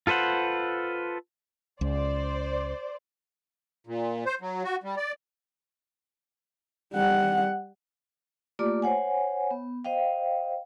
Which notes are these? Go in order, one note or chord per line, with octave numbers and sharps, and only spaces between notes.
F4 A4 B4 C5 F#5
C#2 C5 D5
A#2
C5
F#3
F#4
G3
D5
G3 F#5
A3 A#3 F4 G4 D5 D6
C5 C#5 F#5 G#5
B3
C5 D#5 F5 G5